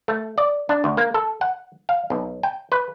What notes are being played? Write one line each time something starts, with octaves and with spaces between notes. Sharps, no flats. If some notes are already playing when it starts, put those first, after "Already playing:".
A3
D5
D4
D2
A#3
A4
F#5
F5
B1
G5
B4